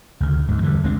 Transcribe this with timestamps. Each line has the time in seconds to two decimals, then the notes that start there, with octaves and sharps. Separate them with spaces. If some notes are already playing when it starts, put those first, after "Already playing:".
0.20 D2 C#3
0.48 D2 G#2
0.62 E2 D3 D#3 G3
0.83 C#2 G#3 C4 D4